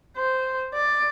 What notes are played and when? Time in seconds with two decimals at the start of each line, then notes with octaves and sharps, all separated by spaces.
0.17 C5
0.74 D5